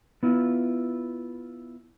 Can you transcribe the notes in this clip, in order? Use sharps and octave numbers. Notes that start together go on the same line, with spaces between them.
B3 E4 F4